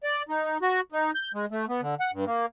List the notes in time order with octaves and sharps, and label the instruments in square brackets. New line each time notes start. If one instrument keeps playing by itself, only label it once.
[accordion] D5
D#4
F#4
D#4
G6
G#3
A3
B3
D3
F#5
G2
A#3